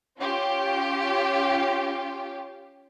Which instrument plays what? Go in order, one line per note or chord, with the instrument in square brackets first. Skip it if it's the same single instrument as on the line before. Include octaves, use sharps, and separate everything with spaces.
[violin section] C#4 F4 G4